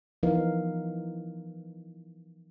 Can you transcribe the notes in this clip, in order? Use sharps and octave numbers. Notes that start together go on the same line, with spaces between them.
E3 F3 B3 D#4 A#4 F5